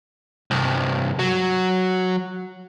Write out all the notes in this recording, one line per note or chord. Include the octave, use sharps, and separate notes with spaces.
C2 G2
F#3